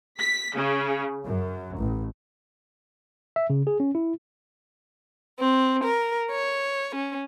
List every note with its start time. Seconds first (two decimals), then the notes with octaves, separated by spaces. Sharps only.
0.19 B6
0.55 C#3
1.26 F#2
1.79 A1
3.36 E5
3.50 C#3
3.67 G#4
3.80 C#4
3.95 E4
5.38 C4
5.83 A#4
6.30 C#5
6.95 C#4